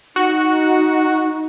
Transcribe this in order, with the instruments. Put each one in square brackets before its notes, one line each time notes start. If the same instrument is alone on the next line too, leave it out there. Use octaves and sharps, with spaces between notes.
[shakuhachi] D#4 [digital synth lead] F#4